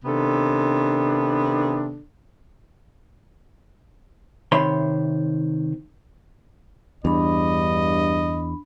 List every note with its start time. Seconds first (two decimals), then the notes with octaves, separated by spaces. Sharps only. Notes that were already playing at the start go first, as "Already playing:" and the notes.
0.05 C3 D#3 B3 D4 A4
4.52 C3 D#3 C#5 E5 B5 C6
7.05 E2 G2 D4 D#5 B5